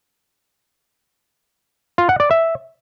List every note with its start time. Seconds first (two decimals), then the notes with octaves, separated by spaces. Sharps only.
1.98 F4
2.09 F#5
2.20 D5
2.31 E5